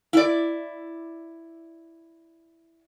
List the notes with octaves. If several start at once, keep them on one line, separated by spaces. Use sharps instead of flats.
E4 D5